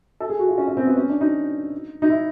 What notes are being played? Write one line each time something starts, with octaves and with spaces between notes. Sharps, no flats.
A4
G#4
F#4
F4
C#4
C#4
C4
B3
C#4
D4
D#4
D#4
E4